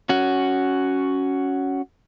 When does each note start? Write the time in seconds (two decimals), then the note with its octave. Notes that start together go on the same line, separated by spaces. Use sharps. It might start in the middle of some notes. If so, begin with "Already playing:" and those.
0.09 C#4 F#4